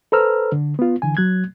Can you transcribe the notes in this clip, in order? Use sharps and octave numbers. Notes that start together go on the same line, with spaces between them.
A4 B4 C5 A#5 E6 F6
D3
B3 F4
D3 E3 G#5
F#3 F#6 G#6